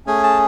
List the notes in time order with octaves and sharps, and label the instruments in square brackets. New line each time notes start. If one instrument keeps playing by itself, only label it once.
[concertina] A3 C#4 G#4 G#5
A5